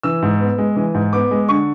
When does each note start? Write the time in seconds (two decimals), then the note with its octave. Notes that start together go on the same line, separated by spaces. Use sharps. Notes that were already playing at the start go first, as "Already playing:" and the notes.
0.03 E3 E6
0.22 G#2
0.40 B3
0.58 G#3
0.76 E3
0.94 G#2
1.13 B3 D6
1.31 G#3
1.49 D3 C#6